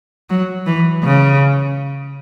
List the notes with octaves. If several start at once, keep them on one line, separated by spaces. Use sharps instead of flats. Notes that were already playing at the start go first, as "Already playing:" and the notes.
F#3
E3
C#3